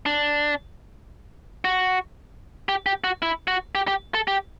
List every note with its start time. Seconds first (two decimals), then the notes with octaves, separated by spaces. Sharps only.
0.06 D4
1.65 F#4
2.69 G4
2.86 G4
3.04 F#4
3.22 E4
3.48 F#4
3.75 G4
3.87 G4
4.15 A4
4.28 G4